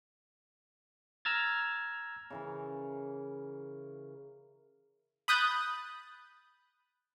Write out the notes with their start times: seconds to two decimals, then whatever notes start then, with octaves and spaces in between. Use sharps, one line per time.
1.25 A#5 E6 F6 G#6 A6
2.30 C#3 E3 A#4
5.28 B5 D#6 F#6 G6 A6